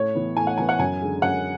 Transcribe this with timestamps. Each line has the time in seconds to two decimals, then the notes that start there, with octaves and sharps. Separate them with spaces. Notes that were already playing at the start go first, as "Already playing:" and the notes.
Already playing: A2 C#5
0.15 E3 B3
0.36 A2 G#5
0.47 F#5
0.58 E3 B3 G#5
0.69 F#5
0.79 F#2 G#5
1.01 D3 G#3
1.22 F#2 F#5